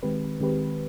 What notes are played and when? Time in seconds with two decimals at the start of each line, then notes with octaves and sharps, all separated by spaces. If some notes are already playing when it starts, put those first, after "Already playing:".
0.03 D#3 G#3 C4 G4 B4
0.41 D#3 G#3 C4 G4 B4